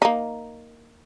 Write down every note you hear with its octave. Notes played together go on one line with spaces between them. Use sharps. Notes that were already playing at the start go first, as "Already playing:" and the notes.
A#3 D#4